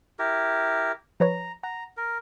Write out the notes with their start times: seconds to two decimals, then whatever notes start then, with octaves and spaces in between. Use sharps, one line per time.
0.19 E4 G4 A#4
1.20 F3 B4 C#5 A#5
1.63 F#5 A#5
1.97 A#4